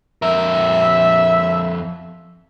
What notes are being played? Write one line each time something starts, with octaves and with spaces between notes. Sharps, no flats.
F2 A#4 E5